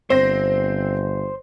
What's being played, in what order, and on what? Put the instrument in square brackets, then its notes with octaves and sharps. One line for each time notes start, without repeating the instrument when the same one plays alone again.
[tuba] G1 [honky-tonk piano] C4 A#6 [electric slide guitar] C5